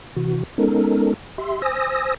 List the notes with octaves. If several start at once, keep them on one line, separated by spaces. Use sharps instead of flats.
C3 E3 F#4
G#3 B3 C#4 D#4 A4 A#4
G4 E5 C6
C5 G#5 D#6 E6 A#6